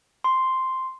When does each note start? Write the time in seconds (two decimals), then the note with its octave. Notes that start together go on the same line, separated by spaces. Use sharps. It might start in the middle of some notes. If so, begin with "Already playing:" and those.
0.24 C6